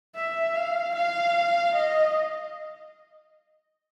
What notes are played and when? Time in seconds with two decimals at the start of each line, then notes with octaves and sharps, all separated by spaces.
0.15 E5
0.55 F5
0.95 F5
1.75 D#5